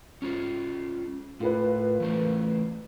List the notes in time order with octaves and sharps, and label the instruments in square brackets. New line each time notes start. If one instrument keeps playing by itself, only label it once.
[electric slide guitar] C#4 F4 C5
[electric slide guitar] A2 [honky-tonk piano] F4 A#4 B4
[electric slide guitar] E3 A3 C5